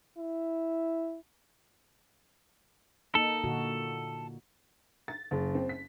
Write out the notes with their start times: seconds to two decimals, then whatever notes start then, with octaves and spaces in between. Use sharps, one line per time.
0.18 E4
3.15 A#3 D#4 A4
3.44 A#2 D3 F#4
5.08 A6
5.31 F#1
5.55 C4
5.69 B6